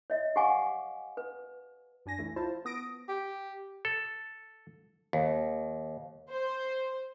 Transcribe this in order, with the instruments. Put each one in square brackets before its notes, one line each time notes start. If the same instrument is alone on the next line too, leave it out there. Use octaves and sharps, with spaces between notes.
[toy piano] C#5 D#5 E5
G4 F5 F#5 G#5 C#6 D6
B4
[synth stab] F#2 D4 G#5 A#6
C#2 E3 A3
E4 F4 C5 A5
B3 D#6 A#6 D7
[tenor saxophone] G4
[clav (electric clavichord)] A4
D#2
[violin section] C5